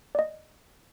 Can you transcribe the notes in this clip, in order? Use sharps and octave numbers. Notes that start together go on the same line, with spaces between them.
D5 D#5